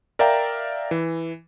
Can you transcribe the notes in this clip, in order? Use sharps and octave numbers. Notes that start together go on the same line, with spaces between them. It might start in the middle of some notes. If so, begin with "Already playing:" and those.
A#4 D5 E5 F5 G5 A#5
E3